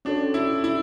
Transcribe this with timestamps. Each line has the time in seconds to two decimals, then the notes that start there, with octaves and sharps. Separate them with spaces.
0.05 C#4 D4 F#4 A4 C#5
0.34 E4
0.64 E4